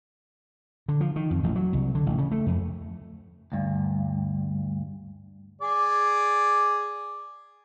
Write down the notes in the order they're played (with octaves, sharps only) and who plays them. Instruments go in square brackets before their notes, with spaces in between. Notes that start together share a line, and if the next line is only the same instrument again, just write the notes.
[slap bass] D3
F3
D#3
F2
A1
F#3
C2
D3
A1
C#3
A3
F2
[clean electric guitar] D2 G2
[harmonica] G#4 D5